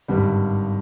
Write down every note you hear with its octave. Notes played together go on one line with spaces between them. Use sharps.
G#1 G2 D3 G3